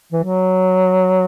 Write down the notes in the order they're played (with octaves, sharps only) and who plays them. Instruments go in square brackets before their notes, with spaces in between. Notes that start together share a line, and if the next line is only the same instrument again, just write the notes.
[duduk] E3
F#3